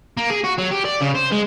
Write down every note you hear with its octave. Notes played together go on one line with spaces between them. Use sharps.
A#3
G#4
F#4
F#3
G4
D5
C#3
C5
G#3